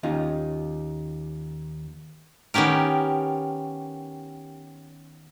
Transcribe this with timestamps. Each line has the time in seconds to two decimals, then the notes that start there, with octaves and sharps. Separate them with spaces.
0.03 D#2 C#4 D#4 F4
2.54 D#3 B3 C#4 G4 A#4